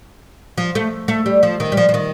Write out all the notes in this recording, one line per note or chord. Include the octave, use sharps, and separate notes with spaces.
F3
A3
A3
G3
F3
D#3
G3
F3
F3
D#3